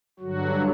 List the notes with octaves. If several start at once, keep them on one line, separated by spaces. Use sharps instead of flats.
G2 D3 F#3 F#4